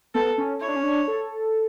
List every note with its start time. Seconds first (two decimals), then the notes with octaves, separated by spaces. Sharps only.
0.14 B3 A4
0.38 C#4
0.61 E4 C#5
0.68 D4
0.76 C#4
0.83 D4
1.08 A4